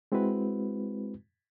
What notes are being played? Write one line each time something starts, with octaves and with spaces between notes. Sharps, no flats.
G#3 C4 E4 F#4 B4